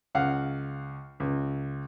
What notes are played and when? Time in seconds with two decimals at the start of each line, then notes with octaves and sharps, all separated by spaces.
0.15 C#2 F5 F#5
1.20 C#2